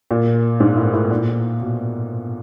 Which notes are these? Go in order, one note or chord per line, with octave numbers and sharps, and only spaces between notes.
A#2
G#2
A2
A2
A#2
B2